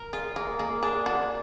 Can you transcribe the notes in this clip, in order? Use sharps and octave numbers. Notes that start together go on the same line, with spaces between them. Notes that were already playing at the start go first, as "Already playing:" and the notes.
Already playing: A#4
F4 G#4
A#3 G#4
A#3 G#4
D4 G#4
D4 F#4